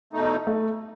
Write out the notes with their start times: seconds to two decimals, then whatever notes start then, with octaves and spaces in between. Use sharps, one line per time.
0.13 E2 B2 A3 D#4
0.47 A3